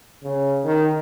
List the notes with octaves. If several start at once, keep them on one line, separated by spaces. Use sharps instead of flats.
C#3
D#3